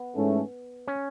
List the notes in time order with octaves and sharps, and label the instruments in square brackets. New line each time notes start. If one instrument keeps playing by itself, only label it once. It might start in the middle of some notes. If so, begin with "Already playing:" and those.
Already playing: [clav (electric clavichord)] B3
[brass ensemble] G#2 E3 A3 C#4
[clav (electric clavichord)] C#4